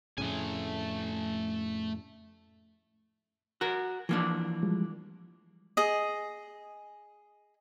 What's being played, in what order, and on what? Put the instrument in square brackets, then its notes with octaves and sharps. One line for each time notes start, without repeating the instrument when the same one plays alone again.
[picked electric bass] F2 A2 C#3 [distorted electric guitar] A3 G#5
[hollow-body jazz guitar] F#4 A#4
[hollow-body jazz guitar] E3 A#3 D4 [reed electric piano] F3
[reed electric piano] F3 G3 G#3
[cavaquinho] G#4 D#5